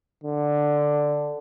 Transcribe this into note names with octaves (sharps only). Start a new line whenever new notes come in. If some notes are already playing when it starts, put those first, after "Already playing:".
D3